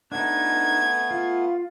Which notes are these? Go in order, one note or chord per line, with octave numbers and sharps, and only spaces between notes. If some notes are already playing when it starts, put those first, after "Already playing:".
A3 B3 D4 D#4 G#6
F4